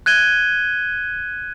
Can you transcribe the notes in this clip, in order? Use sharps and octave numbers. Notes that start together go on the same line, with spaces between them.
F#6 G#6 D#7 G7